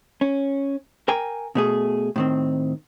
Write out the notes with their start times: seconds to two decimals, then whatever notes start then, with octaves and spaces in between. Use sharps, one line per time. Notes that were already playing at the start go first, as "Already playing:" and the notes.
0.21 C#4
1.08 A#4 G5 G#5
1.55 B2 A3 G#4
2.16 A2 D#3 C4